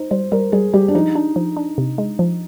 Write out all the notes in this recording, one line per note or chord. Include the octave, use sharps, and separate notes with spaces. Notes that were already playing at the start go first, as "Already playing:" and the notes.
Already playing: D#4 C5
G3 C5
G3 A#4
G3 G#4
G3 G4
D4
F3 D#4
D4
F3
D4
C3
G#3
F3